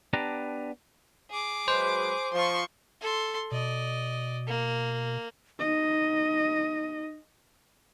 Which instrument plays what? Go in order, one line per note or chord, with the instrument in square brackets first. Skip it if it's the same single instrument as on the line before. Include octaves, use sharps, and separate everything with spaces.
[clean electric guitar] B3 D4 G4 B4 A5 A#5
[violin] G#4 D6
[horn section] F#3 G#3 B4 [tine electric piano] C5
[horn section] F3 [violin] C6 C#6
[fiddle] A4 C6
[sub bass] B2 [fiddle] D5 D#5
[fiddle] A#3
[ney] D#4 [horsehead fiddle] D#5